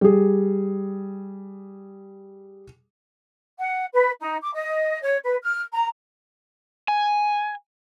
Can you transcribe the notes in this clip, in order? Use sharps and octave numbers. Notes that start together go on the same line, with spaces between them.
G3 G#4
F#5
B4
D#4
D6
D#5
C#5
B4
F6
A#5
G#5